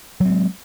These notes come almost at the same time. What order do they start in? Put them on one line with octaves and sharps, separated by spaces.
F#3 C4 G#3